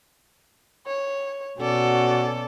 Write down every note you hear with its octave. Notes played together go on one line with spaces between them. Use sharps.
C#5
B2 C#4 F#4 A4 D5